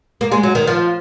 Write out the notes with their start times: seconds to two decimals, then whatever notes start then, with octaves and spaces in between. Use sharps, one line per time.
0.21 A#3
0.32 G#3
0.43 F#3
0.55 D#3
0.67 F3